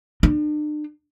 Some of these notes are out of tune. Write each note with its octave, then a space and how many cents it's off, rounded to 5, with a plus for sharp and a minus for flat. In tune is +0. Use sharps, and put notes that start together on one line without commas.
D4 +40